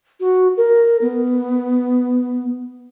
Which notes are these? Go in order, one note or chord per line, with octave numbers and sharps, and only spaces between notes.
F#4
A#4
B3